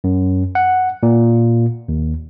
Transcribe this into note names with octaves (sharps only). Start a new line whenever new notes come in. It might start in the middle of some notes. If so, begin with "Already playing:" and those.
F#2
F#5
A#2
D#2